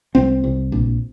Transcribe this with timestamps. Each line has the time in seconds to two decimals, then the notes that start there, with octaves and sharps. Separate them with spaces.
0.15 C2 C4
0.44 C2
0.72 A#1